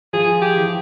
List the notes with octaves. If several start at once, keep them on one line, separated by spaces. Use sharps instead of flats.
F3 G#4
G4
E3